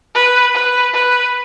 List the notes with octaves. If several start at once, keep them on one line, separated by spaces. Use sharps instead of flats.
B4
B4
B4